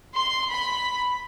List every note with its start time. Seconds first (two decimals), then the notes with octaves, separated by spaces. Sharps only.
0.14 C6
0.52 B5